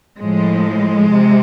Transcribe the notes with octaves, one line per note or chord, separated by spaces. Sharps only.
A2 F3 G#3
C3